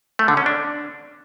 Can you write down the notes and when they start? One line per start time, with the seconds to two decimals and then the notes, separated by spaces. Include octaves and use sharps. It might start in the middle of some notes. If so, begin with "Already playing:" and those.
0.19 A3
0.28 D3
0.37 C#4
0.46 D4